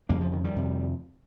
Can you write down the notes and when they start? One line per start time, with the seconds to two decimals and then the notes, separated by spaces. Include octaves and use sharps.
0.09 F2 C#3 G3 A#3
0.21 F3
0.32 D#3
0.44 D#3 G3
0.56 F2 C3